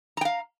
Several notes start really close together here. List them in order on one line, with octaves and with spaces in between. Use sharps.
A#5 G5 F5